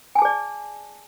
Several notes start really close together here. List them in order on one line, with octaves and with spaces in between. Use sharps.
G#5 A5 G#4 D5